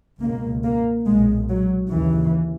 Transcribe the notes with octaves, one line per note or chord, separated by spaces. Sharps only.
C#2 B2 A#3
A#3
B1 A#2 G#3
F#3
D#2 C#3 E3